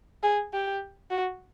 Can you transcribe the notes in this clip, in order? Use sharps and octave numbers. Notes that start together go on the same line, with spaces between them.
G#4
G4
F#4